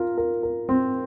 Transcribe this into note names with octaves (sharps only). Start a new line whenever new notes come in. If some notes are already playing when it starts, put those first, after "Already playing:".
Already playing: F4 A#4
A#4
A#4
C4